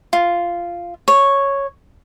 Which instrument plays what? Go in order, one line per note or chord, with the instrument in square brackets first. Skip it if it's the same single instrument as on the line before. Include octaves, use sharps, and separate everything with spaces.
[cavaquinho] F4
C#5